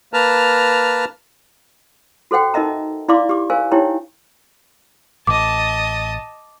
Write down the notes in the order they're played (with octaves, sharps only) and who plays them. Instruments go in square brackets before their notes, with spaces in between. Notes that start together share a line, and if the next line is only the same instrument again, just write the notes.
[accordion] A#3 B4 A5 A#5 F6
[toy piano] F#4 A4 C5 F#5 G5
D#4 A#4 D#5 E5 A#5
E4 D5 F5 C6 D6
G4 D6
A#4 C5 F5 G#5
D#4 E4 G4 C#5 G5 A#5
[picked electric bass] A1 [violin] D#5 A5 [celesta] D6